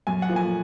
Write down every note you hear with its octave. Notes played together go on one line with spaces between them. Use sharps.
F#2 G#5
F#5
F3 A#3
G#5